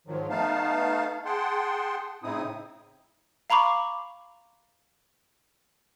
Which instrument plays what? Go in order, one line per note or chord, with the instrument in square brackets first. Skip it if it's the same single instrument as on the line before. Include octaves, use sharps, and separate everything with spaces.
[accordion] G#2 D#3 F3 F#3
A3 B3 D#4 F5 A5
G#4 F#5 G5 A5 C6
A2 C#3 C4 D#4 E4 D#6
[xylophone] F5 A#5 B5 C#6 D6